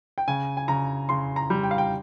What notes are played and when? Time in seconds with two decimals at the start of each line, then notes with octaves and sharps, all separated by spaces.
0.18 G5
0.28 C#3 G#5
0.57 G#5
0.68 C#3 A#5
1.09 C#3 C6
1.36 A#5
1.50 G3
1.63 G5
1.71 F5
1.78 G5